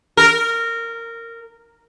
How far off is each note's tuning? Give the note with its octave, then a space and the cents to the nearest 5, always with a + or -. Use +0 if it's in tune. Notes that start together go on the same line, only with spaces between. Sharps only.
A#4 -15